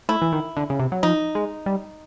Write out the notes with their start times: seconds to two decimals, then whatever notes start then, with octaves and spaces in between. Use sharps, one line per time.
0.09 A3 E4
0.22 E3
0.32 D#3
0.57 D3
0.70 C#3
0.80 C3
0.92 F#3
1.03 F3 D#4
1.35 G#3
1.66 G3